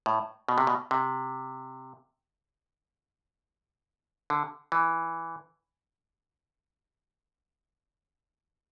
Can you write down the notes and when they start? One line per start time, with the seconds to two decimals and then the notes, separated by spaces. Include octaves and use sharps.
0.06 A2
0.49 B2
0.58 C3
0.67 B2
0.91 C3
4.30 D3
4.72 E3